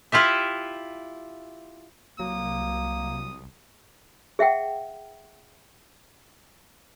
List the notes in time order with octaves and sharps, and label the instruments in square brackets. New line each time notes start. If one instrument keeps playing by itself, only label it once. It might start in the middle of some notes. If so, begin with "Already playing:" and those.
[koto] E4 F4 G4 E5
[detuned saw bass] C2 [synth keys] F#3 [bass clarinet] A#3 [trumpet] D#6
[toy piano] G#4 E5 F#5 G5